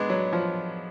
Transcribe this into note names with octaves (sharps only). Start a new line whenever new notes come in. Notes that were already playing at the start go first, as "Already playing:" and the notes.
Already playing: G#3 B3 D4
F#3
F3